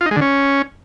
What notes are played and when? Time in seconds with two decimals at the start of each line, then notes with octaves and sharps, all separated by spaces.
0.01 F4
0.06 D#4
0.11 G#3
0.16 D3
0.21 C#4